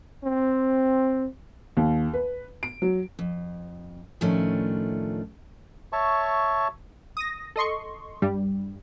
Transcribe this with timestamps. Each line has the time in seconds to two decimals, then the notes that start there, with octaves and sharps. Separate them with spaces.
0.25 C4
1.77 D#2
2.13 B4
2.63 D7
2.82 F#3
3.19 F2
4.21 A2 D#3 F3 A3 C#4 D4
5.93 C#5 E5 A5 C#6
7.17 D#6 A#6
7.56 A4 D#5 C6 C#6
8.22 G2 G3